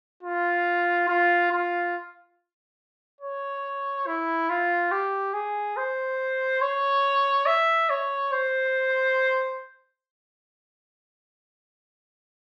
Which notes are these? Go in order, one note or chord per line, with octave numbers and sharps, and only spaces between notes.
F4
F4
F4
C#5
E4
F4
G4
G#4
C5
C#5
E5
C#5
C5